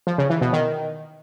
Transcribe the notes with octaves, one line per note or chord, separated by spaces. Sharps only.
F3
C#3
E3
B2
D#3